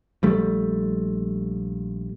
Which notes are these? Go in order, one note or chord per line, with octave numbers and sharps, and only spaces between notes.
A#1 G3 A3